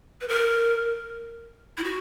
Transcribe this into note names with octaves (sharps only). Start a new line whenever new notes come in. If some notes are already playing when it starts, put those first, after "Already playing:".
B4
A#4
E4
F#4